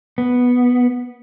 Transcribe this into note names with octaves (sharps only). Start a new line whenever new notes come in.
B3